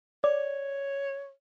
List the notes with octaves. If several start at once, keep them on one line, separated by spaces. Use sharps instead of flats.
C#5 D5